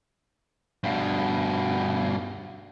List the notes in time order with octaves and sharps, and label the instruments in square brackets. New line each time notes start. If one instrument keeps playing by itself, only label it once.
[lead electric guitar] G2 B2